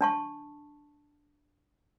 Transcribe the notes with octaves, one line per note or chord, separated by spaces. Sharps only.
D4 A5 C#6